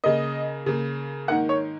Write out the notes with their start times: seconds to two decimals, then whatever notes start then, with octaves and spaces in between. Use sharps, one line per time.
0.04 C#3 A#3 D#5
0.66 C#3 A#3
1.28 G#2 D#3 A#3 F#5
1.49 C#5